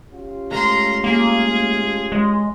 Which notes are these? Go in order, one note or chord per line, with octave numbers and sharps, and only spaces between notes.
C#4 F4 G4
G#3 A3 F5 A#5 C6
A#3 G#4
G#3 C#5 D#5 C6